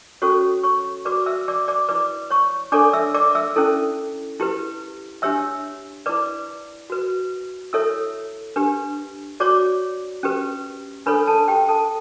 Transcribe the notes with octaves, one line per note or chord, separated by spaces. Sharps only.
C#4 F#4 A4 C#5 C#6
C#5 C#6
F#4 B4 D5 D6
E5 E6
D5 D6
D5 D6
E4 B4 D5 D6
C#5 C#6
D4 A4 C#5 D5 D6
E5 E6
D5 D6
E5 E6
C#4 E4 A4
E4 G4 B4
D4 G4 C#5 E5 E6
E4 B4 D5 D6
F#4 B4
E4 A4 C#5 E5 E6
D4 G4 B4
F#4 C#5 D5 D6
C#4 G4 B4
D4 A4 B4 C#5 B5
A4 A5
G4 G5
A4 A5